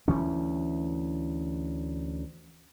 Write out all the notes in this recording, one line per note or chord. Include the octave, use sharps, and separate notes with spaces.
D2 E3 C#4